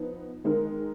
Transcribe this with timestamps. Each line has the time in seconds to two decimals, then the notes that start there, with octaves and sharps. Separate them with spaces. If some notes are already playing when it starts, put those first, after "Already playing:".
Already playing: F3 B3 D#4
0.44 D#3 G#3 D#4 A#4